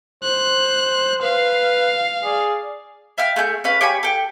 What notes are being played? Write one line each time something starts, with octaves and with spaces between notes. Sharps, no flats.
C5 F#6
B4 F5
G#4 D5
E5 F5 G5 F6
A3 G#4 G5 G6
C#4 B4 F5
G4 C#5 G#5 B5
A4 G5